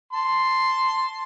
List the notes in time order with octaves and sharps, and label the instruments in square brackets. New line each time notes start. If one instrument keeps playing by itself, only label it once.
[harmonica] A5 C6